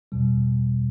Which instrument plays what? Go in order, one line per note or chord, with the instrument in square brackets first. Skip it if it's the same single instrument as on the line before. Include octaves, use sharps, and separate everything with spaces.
[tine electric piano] E2 B2 G3